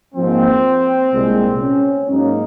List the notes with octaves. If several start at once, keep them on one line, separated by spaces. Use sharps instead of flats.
G#2 F3 A#3 C4
C2 A#2 G#3
C#4
G#2 F#3 A#3 D#4